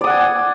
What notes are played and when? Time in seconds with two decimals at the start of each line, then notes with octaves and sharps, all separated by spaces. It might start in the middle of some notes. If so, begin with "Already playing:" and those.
0.01 D5
0.04 D#6
0.07 F#5
0.10 G#5